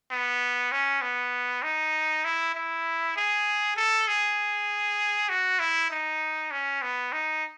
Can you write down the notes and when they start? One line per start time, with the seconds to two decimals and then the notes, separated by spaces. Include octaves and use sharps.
0.11 B3
0.72 C#4
1.01 B3
1.63 D#4
2.24 E4
2.55 E4
3.16 G#4
3.76 A4
4.07 G#4
5.29 F#4
5.59 E4
5.90 D#4
6.51 C#4
6.82 B3
7.12 D#4